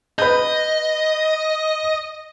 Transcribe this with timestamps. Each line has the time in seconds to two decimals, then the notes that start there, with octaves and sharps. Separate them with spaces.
0.19 B4 D#5 G6